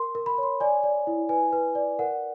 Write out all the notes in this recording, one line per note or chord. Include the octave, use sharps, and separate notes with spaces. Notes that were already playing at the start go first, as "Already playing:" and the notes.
Already playing: A#4 C6
A#4
B5
C#5 C6
D5 G#5
D5
E4
B4 G#5
B4
D5
A#4 F#5